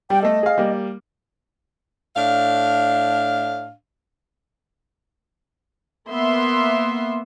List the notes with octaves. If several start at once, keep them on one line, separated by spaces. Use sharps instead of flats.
G3 G5
A3 A4 D#5
G#4 F5
G3 A#3
A2 D4 F5
A#3 B3 E5 C6